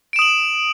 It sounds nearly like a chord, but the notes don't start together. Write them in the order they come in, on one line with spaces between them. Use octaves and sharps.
D7 E7 D#6 F#7